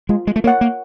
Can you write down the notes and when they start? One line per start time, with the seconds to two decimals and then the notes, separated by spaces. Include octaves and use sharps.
0.09 G#3 F4
0.27 G#3
0.36 A3
0.44 A#3 A#4 C#5 F#5
0.61 A#3